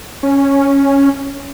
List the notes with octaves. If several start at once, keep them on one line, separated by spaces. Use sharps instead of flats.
C#4